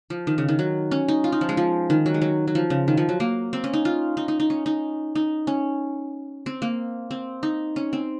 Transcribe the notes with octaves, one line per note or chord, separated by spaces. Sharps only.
F3
D#3
C#3
D#3
F#3
C#4
D#4
F4
D#4
F3
G#3
F3
D#3
F#3
G#3
F#3
F#3
F3
C#3
D#3
F3
F#3
A#3
C4
C#4
D#4
F4
D#4
D#4
D#4
C#4
D#4
D#4
C#4
C4
A#3
C4
D#4
C#4
C4